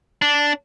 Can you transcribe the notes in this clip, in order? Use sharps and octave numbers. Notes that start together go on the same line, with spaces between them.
D4